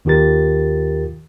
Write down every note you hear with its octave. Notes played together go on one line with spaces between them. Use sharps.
D#2 D#3 F4 G4 A#4 A6